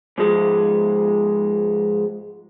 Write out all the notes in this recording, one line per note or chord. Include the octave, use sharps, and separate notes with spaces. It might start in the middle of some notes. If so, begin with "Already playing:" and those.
G#2 F3 G#3